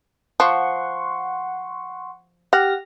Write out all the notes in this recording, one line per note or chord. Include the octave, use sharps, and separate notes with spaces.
F3 F#5 C6 C#6
G4 F#5 F6 A#6